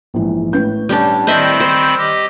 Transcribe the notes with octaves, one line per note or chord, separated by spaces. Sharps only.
A#1 G#2 E3
A2 B4 G6
G3 C#4 D4
D#3 C4 C5 D#5 E5 B5
C5
G4 D#5